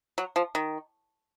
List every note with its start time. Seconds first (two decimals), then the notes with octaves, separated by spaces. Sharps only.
0.18 F#3
0.36 F3
0.55 D#3